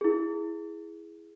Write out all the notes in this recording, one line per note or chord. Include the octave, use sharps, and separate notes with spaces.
E4 G#4